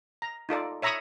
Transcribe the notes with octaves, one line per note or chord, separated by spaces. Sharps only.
A#5
D#4 F4 A4 D5
C#5 E5 A#5 B5 C#6 D#6